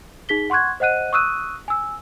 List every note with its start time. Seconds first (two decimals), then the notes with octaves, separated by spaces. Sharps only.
0.29 D#4 G#4 B6 G7
0.50 F#5 C6 C#6 F#6 G#6
0.80 C5 D#5 F#5 F#6 D#7
1.13 C#6 D#6 E6 F#6 D#7
1.68 G#5 E6